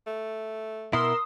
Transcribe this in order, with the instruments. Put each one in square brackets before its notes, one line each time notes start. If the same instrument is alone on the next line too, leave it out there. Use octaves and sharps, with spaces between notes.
[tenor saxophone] A3
[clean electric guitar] B2 E4 [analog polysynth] A#4 C6 E6 [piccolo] D#6